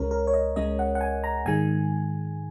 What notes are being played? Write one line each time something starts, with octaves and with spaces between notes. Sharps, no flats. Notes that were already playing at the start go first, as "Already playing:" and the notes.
Already playing: C#2 C#3 G#3 C#4 A#4 C#5
A#4
C#5
D#5
C#2 C#3 G#3 C#4 D#5
F#5
F#5
G#5
A#5
G#2 D#3 G#3 G#5